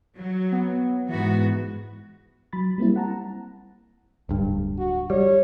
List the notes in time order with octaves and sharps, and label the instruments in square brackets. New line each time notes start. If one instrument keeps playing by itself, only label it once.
[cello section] F#3
[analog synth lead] B3
[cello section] G#2 B3 F#4 [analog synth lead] E3
[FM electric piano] F#3 B5 A6
G3 A#3 C4 E4
F#5 A5 A#5
[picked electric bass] D1 G2
[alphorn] F#4
[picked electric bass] G3 [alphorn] C#5